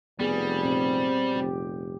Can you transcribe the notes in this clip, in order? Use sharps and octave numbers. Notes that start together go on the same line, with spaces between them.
F1 G3 B3 G#4
A#2 C4
F1 G4